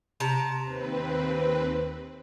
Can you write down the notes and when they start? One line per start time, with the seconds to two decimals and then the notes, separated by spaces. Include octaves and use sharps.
0.20 C3 A5 A#5
0.62 D#2 C4 B4